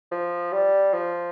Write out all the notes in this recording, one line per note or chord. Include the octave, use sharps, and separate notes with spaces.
F3
G3
F3